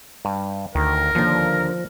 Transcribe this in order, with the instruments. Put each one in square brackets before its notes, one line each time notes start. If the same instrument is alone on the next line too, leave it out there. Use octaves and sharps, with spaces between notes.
[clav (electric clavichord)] G2
[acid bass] D2 [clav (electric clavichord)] D#3 [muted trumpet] A#4
[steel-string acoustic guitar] D#2 D3 [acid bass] F3